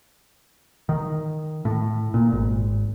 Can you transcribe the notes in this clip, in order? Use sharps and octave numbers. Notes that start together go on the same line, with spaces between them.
D#3
A2
A#2
G#1